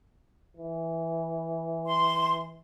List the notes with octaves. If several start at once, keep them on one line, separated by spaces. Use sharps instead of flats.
E3
C6